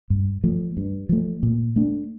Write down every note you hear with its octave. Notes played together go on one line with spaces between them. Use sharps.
G2
F3 A3
G2
F3 A3
A#2
A3 D4